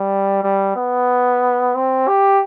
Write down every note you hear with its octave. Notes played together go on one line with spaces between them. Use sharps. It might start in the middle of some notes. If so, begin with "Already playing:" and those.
Already playing: G3
G3
B3
C4
G4